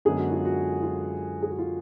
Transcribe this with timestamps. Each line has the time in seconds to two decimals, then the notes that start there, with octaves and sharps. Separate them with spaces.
0.05 F#2 D3 G#3 B3 G#4
0.18 F#4
0.31 F4
0.45 F#4
0.82 F4
1.43 G#4
1.50 F#4
1.58 F4